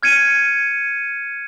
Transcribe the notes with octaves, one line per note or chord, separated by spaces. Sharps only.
F6 G#6 C#7 D#7